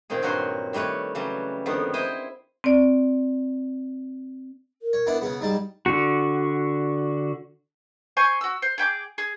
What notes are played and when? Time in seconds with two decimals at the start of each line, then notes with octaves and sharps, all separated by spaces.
0.10 A#2 D#3 C4 G#4
0.22 G2 A#2 F#3 F#4 G#5 C6
0.73 D#3 G3 A3 B4 C#5
1.15 C#3 E3 F#3 G3
1.66 F2 D3 D#3 G3 B3
1.94 E4 C5 D#5 G5 G#5
2.64 C4 D5
4.82 A#4
4.93 C#5
5.06 B3 D4 E4
5.21 C#3 B3 G#4
5.41 G#2 G3 A5
5.86 D3 F#4
8.17 C5 G#5 C#6
8.41 F#4 E6
8.62 C5
8.78 G#4 G5 B5 D6
9.18 G#4